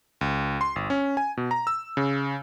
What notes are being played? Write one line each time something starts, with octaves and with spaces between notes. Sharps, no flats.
C#2
C6
G1
C#4
G#5
B2
A#5
E6
C#3